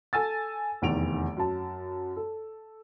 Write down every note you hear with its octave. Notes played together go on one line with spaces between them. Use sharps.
A4 G#5 E6 A6
F1 E2 D#3 D7 F7
F#2 A5
A4